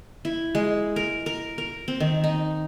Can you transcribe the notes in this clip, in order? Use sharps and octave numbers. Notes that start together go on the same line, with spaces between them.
E4
G#3
A#4
A#4
A#4
C4
D#3
D#4